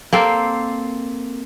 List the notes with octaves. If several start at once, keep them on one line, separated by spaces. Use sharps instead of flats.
A#3 C4 A4